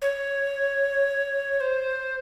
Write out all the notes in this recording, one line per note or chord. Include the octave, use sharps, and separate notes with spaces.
C#5
C5